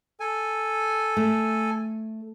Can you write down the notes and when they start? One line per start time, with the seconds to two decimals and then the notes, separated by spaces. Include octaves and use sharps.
0.20 A4 G#5
1.17 A3